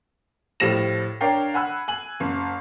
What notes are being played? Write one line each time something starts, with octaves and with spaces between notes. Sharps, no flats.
A2 F3 G3 A#6 E7
D4 A#4 C#5 F5 G5 C7
F#5 G#5 B5 E6 F#6
G#5 F#7
F#1